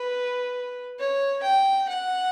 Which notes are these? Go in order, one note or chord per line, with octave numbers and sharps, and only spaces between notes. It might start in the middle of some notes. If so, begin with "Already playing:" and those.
Already playing: B4
C#5
G5
F#5